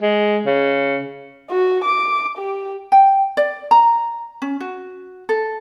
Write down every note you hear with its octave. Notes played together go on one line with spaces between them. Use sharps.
G#3
C#3
F#4
D6
G4
G5
D5
A#5
C#4
F#4
A4